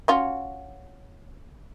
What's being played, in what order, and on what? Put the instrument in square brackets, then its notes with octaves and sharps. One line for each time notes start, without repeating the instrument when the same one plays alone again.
[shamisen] C#4 F4 F#4